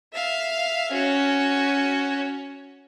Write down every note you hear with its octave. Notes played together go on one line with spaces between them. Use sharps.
E5 F5
C#4 F#4